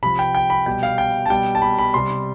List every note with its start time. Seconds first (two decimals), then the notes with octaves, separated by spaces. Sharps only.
0.02 C3 F3 B5
0.19 G5
0.35 G5
0.50 B5
0.66 B2 G3 G5
0.83 F5
0.98 G5
1.26 A5
1.30 B2 G3 G5
1.55 A5
1.62 B5
1.79 B5
1.94 C3 G3 C6